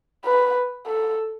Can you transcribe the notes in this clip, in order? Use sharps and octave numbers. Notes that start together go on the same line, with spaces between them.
B4
A4